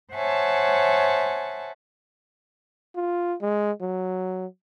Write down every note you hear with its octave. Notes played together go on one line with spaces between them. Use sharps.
C5 C#5 E5 F#5 G#5 A5
F4
G#3
F#3